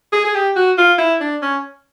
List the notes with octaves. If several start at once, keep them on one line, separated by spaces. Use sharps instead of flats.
G#4
G#4
G4
F#4
F4
E4
D4
C#4